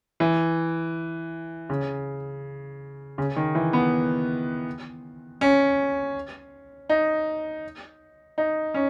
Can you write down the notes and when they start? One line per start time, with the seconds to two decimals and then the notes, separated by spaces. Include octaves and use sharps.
0.20 E3
1.70 C#3
3.18 C#3
3.36 D#3
3.55 E3
3.73 B3
5.41 C#4
6.89 D#4
8.38 D#4
8.74 C#4